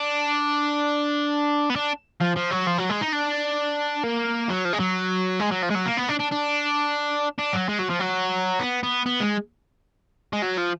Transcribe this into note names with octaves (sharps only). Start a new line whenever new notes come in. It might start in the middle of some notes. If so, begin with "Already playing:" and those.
Already playing: D4
B3
D4
F3
F3
F#3
F3
F#3
G#3
D#4
D4
A#3
F#3
F3
G#3
F#3
G#3
F#3
F3
G#3
F#3
A#3
B3
D4
D4
D4
D4
F#3
G#3
F#3
F3
F#3
B3
B3
B3
G#3
G#3
F#3
F3